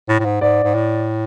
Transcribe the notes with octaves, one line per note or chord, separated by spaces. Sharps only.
A2
A2
G#2
G#2 D5
G#2
A2